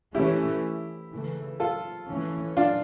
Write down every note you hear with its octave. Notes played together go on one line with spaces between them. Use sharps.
E3 A3 C#4 E4 G4
C#3 E3 A3
F4 A4
E3 A3 C#4
D4 F4